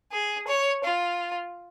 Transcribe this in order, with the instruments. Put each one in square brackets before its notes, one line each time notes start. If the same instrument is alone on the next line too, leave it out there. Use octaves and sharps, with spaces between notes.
[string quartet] G#4
C#5
F4